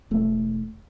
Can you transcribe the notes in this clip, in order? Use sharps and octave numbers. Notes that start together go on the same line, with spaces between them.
E1 A3